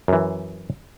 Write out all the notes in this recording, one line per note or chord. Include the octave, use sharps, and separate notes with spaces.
F#2 E3